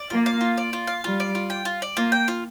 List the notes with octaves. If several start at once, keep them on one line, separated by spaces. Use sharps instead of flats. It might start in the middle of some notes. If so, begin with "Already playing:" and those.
Already playing: D5
A#3 F4
F5
F4
D5
F4
F5
G3 F4
D5
F4
G5
F4
D5
A#3 F4
G5
F4